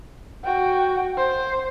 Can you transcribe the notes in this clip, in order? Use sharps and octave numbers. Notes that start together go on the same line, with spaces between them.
F#4 G5
C5